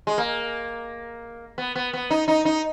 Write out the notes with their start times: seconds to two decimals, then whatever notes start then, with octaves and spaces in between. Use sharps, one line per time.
0.07 G#3
0.18 A#3
1.58 B3
1.75 B3
1.93 B3
2.10 D#4
2.28 D#4
2.45 D#4